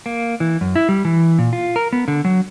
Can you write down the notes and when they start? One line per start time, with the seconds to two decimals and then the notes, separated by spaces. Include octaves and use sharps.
0.06 A#3
0.40 E3
0.61 F#2
0.76 E4
0.89 G3
1.05 E3
1.39 A#2
1.53 F4
1.76 A#4
1.93 B3
2.08 D3
2.25 F#3